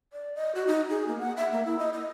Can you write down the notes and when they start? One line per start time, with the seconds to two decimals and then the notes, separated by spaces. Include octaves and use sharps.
0.13 D5
0.36 D#5
0.55 F#4
0.67 D#4
0.90 G#4
1.08 A#3
1.19 F#5
1.37 E5
1.52 A#3
1.65 E4
1.79 D#5
1.93 D#5